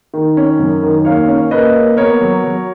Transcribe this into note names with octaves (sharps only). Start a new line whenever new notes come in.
D#3
C#4
F#2
D#3
A#3 C#5 F5
C#4
A#3 B4 D#5
A#3
B3 A#4 C#5
F#3
F#3